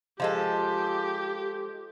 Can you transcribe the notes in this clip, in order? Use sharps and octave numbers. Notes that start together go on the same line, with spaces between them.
F3 G#3 G4 A4